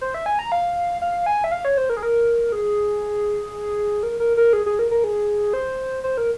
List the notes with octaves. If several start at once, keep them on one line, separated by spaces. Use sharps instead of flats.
C5
E5
G#5
A#5
F5
F5
G#5
E5
F5
C#5
C5
A#4
G#4
A#4
G#4
A#4
A#4
A#4
G#4
G#4
A#4
A#4
G#4
C5
C5
A#4